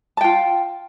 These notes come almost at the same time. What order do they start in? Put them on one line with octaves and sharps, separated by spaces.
A5 G5 F4